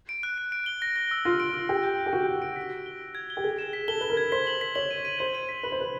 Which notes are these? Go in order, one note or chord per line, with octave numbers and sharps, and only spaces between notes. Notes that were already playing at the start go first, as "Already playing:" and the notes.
D7
F#6
D7
D7
G7
A#6
A#6
E6
F4 A#6
D7
E6
G4 E6
G6
A#6
G4
F#4 D7
G6
D7
B6
B6
G7
B6
G#6
G7
G4
G#4 G#6
E7
B6
A4 G7
B4 G7
A#4
G#6
C5 B6
F#7
B6
C#5 F#7
D#7
D#7
C5 G#6
D#7
B6
B4 F#7
C5
B4 F#7